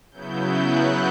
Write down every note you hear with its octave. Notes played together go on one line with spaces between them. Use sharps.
C#3 F#3 B3 E4 G6
F#6